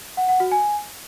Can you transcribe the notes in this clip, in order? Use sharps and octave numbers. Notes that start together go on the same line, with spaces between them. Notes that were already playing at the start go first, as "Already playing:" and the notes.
F#5
F#5
F#4
G#5